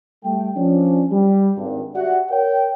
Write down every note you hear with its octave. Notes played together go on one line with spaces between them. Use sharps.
G3 A3 G5
F3 C#4 D4
G3
G#1 G2
F#4 G4 D5 E5 F#5
A#4 C#5 G5